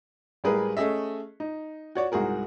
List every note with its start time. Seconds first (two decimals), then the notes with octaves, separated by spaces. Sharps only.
0.44 A1 G3 G#3 G#4 A#4 B4
0.77 A3 C#4 G#4 D#5 E5
1.40 D#4
1.95 F#4 C#5 D5
2.12 C2 G#2 F#4 G#4 A#4